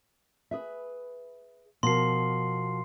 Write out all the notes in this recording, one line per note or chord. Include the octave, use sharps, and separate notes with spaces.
G#4 B4 E5
B2 F3 A#4 C6 C7